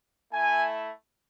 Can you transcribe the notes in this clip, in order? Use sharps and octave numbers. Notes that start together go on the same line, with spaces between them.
A3 E4 G#5